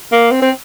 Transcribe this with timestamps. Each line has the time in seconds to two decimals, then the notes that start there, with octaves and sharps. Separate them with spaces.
0.12 A#3
0.31 C4
0.42 C4